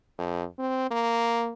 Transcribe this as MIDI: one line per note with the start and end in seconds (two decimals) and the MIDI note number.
0.19 0.44 41
0.59 0.90 60
0.91 1.53 58